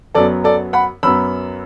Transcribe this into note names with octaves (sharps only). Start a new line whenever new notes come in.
F#2 F#3 B3 A4 D5
A4 D5
F#5 B5
F#2 F#3 B3 B5 E6